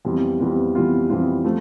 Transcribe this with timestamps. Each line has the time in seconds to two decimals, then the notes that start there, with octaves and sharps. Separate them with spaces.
0.05 F2 E3 G3 B3 F4
0.39 F2 E3 G3 B3 F4
0.75 F2 E3 G3 B3 F4
1.10 F2 E3 G3 B3 F4
1.44 F3 A3